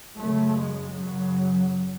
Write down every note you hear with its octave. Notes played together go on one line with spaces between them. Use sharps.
F#2 C#3 A3
G#3
F#2 C#3 F#3